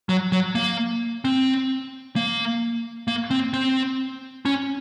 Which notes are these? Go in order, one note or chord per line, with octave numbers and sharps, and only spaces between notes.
F#3
F#3
A#3
C4
A#3
A#3
C4
C4
C#4